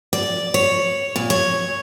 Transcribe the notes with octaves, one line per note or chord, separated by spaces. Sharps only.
D5
C#5
A#2
C#5